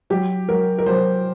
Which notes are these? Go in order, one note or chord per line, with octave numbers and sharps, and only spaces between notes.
F#3 G4
F#3 A#4
A#4
F#3 C5